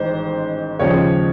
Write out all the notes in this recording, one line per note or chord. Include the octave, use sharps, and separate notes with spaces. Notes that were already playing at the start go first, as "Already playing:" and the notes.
Already playing: A1 G#2 D#3 C5
D#2 C#3 F3 G#3 C#5